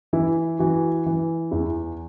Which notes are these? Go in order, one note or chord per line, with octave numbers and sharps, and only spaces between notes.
E3 E4
E3 F#4
E3
E2 E4